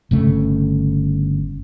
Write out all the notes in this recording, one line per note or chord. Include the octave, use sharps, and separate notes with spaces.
G1 C#3 A3